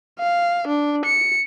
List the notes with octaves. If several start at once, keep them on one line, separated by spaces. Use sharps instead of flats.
F5
D4
C#7